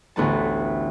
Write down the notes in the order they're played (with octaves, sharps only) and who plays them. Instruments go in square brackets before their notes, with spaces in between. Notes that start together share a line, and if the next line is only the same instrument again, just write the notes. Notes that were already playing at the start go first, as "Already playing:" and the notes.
[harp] A1 D2 B3 A5